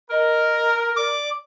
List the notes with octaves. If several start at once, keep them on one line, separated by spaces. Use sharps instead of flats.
A#4 D#5
D5 D6